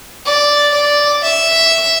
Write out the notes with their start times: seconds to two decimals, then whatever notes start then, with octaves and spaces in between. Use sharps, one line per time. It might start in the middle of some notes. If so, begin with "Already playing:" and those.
0.26 D5
0.74 D5
1.23 E5